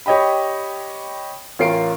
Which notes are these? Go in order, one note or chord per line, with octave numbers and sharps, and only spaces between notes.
G4 C#5 D#5 G5 B5
A1 C#4 F4 A#4 C7 D7